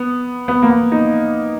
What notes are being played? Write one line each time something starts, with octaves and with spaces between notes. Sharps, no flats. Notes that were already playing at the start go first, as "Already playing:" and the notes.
Already playing: B3
B3
A#3
B3
D#4